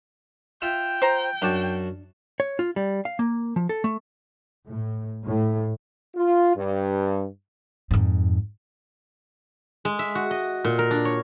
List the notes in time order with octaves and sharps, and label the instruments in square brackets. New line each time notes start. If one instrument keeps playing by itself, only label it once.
[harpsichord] F4 E5 [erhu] G5
[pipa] C5 A#5
[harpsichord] F#2 F#4 A5 [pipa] D4
[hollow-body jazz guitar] C#5
F4
G3
F5
A#3
F3
A4
A3
[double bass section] A2
A2
[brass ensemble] F4
G2
[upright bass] F2 G#2
[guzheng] G#3
E5
F#4
D#5
A#2
A#4
D4
C#5